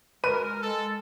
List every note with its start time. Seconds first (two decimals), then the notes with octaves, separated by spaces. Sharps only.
0.24 G#3 A#4 B4 D#7
0.62 G#3 A4